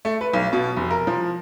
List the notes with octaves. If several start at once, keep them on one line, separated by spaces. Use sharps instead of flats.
A3
B4
B1
B2
F1
A#4
F3